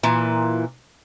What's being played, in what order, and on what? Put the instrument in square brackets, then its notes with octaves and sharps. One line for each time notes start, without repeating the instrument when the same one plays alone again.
[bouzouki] A#2 E3